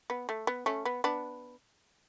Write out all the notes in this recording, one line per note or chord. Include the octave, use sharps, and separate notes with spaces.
B3
A3
B3
A3 C#4
B3
B3 D4